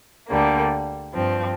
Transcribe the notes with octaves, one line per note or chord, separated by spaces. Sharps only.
D2 D3 G3 A#3
G2 F3 C4